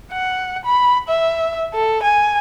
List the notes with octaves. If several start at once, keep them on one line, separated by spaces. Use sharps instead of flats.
F#5
B5
E5
A4
G#5